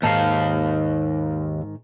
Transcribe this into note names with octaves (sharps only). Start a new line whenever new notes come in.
D#2 G#2 D#3 F5 A5